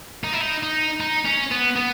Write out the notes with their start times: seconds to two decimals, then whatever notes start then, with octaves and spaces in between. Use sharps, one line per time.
0.24 D#4
0.33 E4
0.41 D#4
0.63 D#4
1.00 D#4
1.25 C#4
1.51 B3
1.76 B3